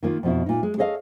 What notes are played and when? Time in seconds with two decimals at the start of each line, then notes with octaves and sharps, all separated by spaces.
0.03 D#3 A#3 F4
0.23 F2 B2 E4
0.46 A#2 D#4
0.63 G#3
0.78 G#4 A4 C#5 D#5 F5